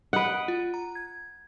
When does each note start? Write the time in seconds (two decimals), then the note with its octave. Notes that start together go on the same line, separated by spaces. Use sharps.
0.13 B4 D#5 F#5 D#6 D7
0.48 F4
0.74 A#5
0.95 G#6